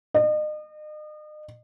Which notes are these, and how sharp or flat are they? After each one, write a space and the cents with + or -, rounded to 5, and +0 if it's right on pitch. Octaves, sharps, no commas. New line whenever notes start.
D#5 -40